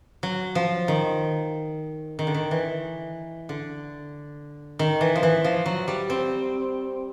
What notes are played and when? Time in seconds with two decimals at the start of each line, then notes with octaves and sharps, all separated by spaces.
0.23 F#3
0.55 F3
0.88 D#3
2.19 D#3
2.27 D3
2.34 D#3
2.51 E3
3.49 D3
4.79 D#3
5.01 E3
5.16 F3
5.23 E3
5.44 F3
5.66 F#3
5.88 G3
6.10 C4